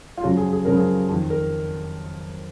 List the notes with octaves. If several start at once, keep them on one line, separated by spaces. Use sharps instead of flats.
F4
F#2 C#3 F3 F#4
G#4
G#4
F#2 C#3 F3 A#4
G#4
F2 D#3
A#4